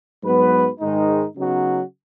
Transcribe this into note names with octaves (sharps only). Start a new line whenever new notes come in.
G#2 F#3 B3 F#4 B4
G#2 D#3 G#3 D#4
C#3 F#3 B3 D#4 F#4